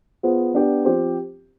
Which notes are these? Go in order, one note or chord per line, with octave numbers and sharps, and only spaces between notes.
B3 F4 G#4 C5
B3 D4 G4 D5
F3 C4 G4 C5